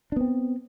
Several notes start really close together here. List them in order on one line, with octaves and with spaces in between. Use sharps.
D4 B3 C4